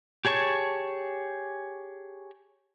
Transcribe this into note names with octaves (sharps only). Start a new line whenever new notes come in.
G4 G#4 C#5 A5 C#6